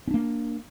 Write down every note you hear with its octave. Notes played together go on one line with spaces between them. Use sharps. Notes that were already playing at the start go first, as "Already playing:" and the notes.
A#3 C#4 D4